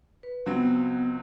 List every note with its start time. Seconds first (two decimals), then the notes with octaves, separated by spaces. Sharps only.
0.23 B4
0.46 C#2 F#3 B3 C4 F#5